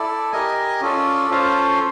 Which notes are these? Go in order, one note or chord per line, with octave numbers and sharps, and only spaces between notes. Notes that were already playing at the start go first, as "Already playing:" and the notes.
Already playing: E4 A4 D5
G4 A#4 D#5 G#5
C#4 F4 A4 D5
C#4 F4 A4 C5 F5